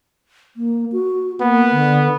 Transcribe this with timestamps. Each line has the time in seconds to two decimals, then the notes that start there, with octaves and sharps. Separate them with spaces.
0.57 A#3
0.92 F#4
1.40 A#3 B3
1.72 D3